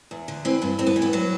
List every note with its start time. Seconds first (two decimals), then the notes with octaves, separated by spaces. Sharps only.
0.11 E2
0.28 D3
0.45 E3 C4
0.62 G2
0.79 G2 C4
0.86 B3
0.96 E3
1.02 B3
1.13 F#3 B3